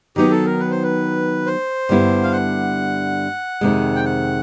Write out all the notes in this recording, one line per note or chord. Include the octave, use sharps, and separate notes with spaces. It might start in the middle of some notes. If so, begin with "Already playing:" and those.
D#3 F#3 B3 D#4 G4
A4
A#4
B4
C5
B4
C5
G2 D3 G3 B3 E4
F5
F#5
F2 C3 D#3 G#3
G5
F#5